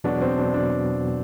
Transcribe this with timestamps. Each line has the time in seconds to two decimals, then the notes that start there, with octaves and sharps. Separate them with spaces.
0.04 E2 B2 F#3 B3 D4 F#4
0.21 C4
0.38 D4
0.54 D4